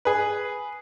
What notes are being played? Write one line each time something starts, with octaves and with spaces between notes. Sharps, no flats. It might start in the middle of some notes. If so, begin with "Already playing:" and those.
G#4 B4